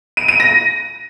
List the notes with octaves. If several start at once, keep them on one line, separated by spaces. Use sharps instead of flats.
D#7
D#7
A#6